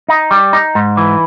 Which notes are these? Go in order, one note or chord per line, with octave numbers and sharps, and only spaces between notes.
D#4
G3
D#4
G#2
E3